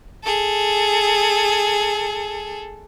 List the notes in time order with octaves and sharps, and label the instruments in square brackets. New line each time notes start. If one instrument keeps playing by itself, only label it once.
[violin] G#4 A4